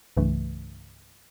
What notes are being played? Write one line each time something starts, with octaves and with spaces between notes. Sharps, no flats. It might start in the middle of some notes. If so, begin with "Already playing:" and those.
C2 G2 C#3 E3 A3